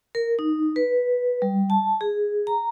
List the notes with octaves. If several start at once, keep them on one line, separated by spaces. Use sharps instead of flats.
A#4
D#4
B4
G3
A5
G#4
A#5